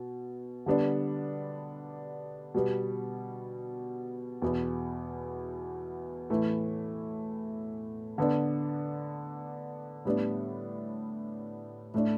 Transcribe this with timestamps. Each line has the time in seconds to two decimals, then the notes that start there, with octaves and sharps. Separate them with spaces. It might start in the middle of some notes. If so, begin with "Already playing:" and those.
Already playing: B2
0.66 D3 G3 B3 D4
2.54 B2 G3 B3
4.42 E2 B2 B3
6.30 A2 E3 A3 E4
8.18 D3 B3 D4
10.05 A2 G3 B3 D4
11.94 A2 A3 D4